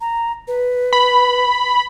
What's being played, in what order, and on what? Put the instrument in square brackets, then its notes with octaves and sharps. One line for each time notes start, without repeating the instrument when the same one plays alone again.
[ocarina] A#5
B4
[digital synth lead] B5